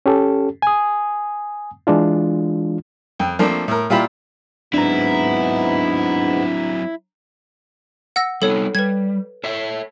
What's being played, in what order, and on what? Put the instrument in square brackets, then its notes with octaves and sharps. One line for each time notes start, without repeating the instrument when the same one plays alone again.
[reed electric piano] C#4 G4 A4
G#5 D#6
E3 G#3 D4 F4
[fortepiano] F2 G5
F3 A3 A#3 C4 D4
A2 A#4
A#2 E4 F4 G4 E5 B5
[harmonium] G#2 B3 [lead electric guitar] F#3 C4 [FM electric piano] D4 A#5 [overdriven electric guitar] E4
[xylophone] F#5 E6 A#6
[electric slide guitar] G3 B3 D#4 [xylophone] A4 C#5
[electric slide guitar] G3 [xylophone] B4 G#6
[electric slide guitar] A4 C#5 E5